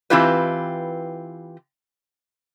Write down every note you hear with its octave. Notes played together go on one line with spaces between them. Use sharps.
E3 C4 E4 F4 G4 B4